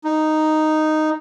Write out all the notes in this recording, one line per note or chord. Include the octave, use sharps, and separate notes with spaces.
D#4